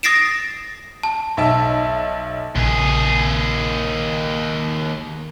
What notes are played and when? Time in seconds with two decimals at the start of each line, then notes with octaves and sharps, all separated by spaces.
0.03 D#6 A6 A#6 C7 D7 E7
1.03 A5
1.37 B1 E5 A5
2.56 A#1 D#2 C#3 G#4